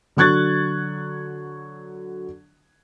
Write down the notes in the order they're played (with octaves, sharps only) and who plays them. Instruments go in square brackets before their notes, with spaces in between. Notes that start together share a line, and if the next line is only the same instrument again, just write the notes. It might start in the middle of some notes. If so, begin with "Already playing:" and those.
[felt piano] D3 F#3 C#6 F#6 G#6 A6